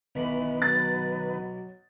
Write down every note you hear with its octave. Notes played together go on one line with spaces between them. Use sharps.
B1 D#3 E3 B4 B5
F#3 A6